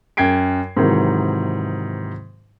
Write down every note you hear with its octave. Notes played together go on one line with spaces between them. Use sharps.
F#2 G5 G#6 C7 D7
G#2 C3 D#3 E3 F#3